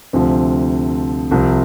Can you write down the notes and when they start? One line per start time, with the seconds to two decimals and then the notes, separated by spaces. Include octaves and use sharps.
0.13 D2 C3 F3
1.31 C2 C3 F3